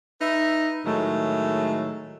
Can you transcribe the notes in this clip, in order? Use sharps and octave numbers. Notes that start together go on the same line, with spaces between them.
D#4 B4 E5
A2 D#3 F#3 G#3 A3